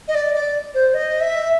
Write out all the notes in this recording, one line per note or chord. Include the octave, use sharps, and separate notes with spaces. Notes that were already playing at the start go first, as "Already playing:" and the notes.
D#5
D5
D5
C5
D#5
E5